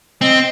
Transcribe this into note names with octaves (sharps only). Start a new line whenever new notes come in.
C4 D#5